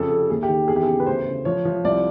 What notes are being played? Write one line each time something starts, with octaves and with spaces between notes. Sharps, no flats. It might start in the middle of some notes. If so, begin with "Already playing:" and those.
Already playing: F2 C#3 A4
C3
D#2 G#4
G4
D#3
E2 G#4
G4
G#4
C#3
B4
D2 C5
C#3
F3 C#5
F3
C2 D5